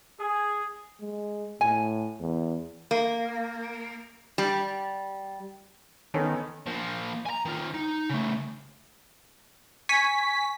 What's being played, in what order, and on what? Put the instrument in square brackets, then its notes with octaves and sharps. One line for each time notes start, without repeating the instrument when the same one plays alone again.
[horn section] G#4
[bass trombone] G#3
[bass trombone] A2 [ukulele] G#5
[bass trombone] E2
[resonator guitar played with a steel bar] A#3
G3
[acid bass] D#3 [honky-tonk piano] B3 C#4 A4
[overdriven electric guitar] F3 A#3
G#5 A#5
D#3 F4
D#4
C#3 A3
[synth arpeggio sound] G#5 C#6 B6